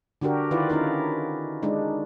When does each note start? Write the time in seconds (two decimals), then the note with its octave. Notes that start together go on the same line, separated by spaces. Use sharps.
0.21 D3 D4 F#4 G4 A#4
0.51 D#3 E4 F4 B4 D5
0.69 C#4 D#4 E4 A#4
1.63 G#3 D4 D#4